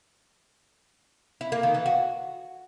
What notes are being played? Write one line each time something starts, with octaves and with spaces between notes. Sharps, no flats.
E4
A#3
D#3
E3
F#4